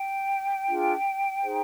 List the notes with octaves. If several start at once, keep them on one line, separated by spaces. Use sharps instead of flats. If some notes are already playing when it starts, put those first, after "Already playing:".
Already playing: G5
D4 F4 G#4
D#4 G#4 C5